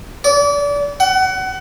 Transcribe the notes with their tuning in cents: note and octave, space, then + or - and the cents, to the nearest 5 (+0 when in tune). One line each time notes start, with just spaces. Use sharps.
D5 -30
F#5 +25